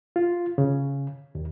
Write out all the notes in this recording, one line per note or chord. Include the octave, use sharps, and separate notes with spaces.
F4
C#3
D#2